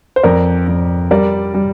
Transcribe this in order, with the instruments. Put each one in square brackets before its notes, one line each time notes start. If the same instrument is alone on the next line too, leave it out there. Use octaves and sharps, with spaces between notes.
[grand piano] C5
F2 A#4 D5
F2
G3 A#4 D5
G3